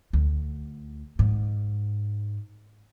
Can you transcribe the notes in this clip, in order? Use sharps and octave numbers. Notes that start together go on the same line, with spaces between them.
D2
G#2